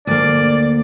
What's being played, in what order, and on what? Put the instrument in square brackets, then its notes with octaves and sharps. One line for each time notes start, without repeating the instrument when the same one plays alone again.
[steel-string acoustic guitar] D2 A#3 [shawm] D5